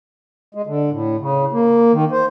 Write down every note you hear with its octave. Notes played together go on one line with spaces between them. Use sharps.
G#3
D3
A2
C#3
A#3
D#3
C5